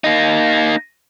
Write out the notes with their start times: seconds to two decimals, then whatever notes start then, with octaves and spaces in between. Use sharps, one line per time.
0.04 A#3 D#4